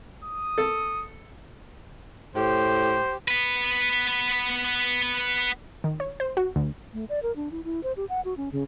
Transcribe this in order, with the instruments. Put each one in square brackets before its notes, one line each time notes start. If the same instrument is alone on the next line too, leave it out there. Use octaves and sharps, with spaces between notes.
[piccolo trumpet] D#6
[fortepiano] A4
[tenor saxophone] A2 [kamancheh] G4 [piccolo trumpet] C5
[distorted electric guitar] B3 B4
[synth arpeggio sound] D#3
C#5
C5
F#4
D2
[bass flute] A3
D5
A#4
D4
E4
E4
C5
G4
F#5
F#4
C#4
C#3